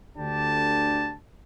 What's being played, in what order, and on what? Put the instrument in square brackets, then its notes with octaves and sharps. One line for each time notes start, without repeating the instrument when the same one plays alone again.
[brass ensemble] D2 D3 D4 G4 A5